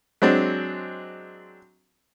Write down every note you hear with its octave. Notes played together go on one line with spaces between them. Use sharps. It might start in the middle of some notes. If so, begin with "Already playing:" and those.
F#3 G#3 C4 D4